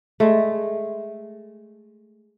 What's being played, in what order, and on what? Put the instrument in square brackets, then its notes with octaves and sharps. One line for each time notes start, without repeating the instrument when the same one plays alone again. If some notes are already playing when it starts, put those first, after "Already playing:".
[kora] G#3 A3